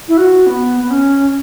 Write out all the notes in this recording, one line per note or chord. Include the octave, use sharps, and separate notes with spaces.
E4
F#4
B3
B3
C#4